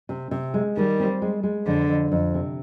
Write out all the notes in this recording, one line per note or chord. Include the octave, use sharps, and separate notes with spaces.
C3
C3
G#3
D#3 G3
C4
G#3
G#3
F2 D3
F2
F2
C3